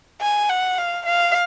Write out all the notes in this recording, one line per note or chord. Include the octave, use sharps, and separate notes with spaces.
G#5
F#5
F5
F5